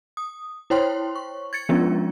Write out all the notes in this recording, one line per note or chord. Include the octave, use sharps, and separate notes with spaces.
D#6
E4 C5 C#5 G5 C6
C#6
G#6 A6 C#7
F3 G#3 B3 C#4 D4 F4